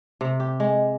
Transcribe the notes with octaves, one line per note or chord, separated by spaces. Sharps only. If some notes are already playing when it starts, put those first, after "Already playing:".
C3
G4
G#3